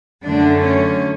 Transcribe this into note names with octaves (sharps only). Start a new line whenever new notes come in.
F#2 D3 A3 D4
C#4